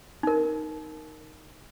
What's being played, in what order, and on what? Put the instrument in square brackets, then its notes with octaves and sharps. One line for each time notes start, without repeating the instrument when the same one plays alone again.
[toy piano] D#4 A#4